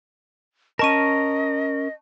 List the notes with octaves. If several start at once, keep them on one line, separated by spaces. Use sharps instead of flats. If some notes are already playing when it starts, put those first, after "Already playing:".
C#4 A#4 D#5 A5 C#6 D#7